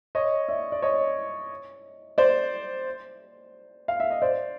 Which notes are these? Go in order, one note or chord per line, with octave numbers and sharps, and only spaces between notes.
C#5 D#5
D5 E5
D5
C#5 D#5
C5 D5
F5
E5
D#5
C5 D5